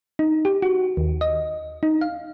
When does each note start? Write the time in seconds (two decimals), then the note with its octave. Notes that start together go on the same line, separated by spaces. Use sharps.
0.19 D#4
0.45 G4
0.62 F#4
0.97 D#2
1.21 D#5
1.83 D#4
2.01 F5